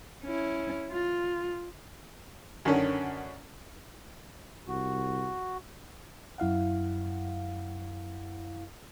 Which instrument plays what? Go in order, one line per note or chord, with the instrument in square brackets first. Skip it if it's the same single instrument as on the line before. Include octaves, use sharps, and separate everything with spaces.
[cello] C#4 E4
F4
[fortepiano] F#2 D3 D#3 C#4
[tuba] C2 [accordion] F#4
[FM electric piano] F#2 E4 F5 F#5